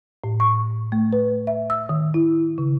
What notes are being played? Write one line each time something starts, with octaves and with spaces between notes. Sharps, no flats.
A2
C#6
A3
B4
E5
E6
D#3
E4
C#3